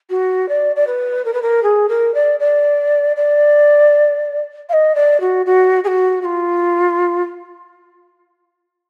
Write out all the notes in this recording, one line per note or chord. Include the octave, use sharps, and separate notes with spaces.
F#4
D5
D5
B4
A#4
B4
A#4
G#4
A#4
D5
D5
D5
F5
D#5
D5
F#4
F#4
G#4
F#4
F#4
F4